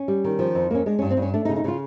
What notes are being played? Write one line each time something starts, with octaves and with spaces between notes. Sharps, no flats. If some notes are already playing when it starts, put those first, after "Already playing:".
Already playing: C#4
G3
D#3
F3
F2
A#3 C#4
G#3 D4
G2 C#4
C4
G2
C#4
A3 D4
D#4
C#3
D#4
C#3 F4